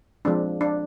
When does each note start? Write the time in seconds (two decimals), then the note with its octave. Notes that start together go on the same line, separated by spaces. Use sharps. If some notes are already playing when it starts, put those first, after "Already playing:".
0.25 F3 G#3 C4 D4
0.61 D4